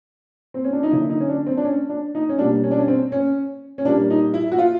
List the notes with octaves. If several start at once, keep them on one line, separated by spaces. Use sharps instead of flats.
C4
C#4
D4
D#4
D3 F#3 A#3 E4
D#4
C#4
D4
C4
D4
C#4
D4
D#4
C#4
B2 G3 A#3 D4
C#4
D4
C#4
C4
C#4
C#4
A#2 G3 A#3 D4
D#4
E4
F#4
F4